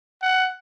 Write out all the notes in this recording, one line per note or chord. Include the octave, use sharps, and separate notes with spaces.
F#5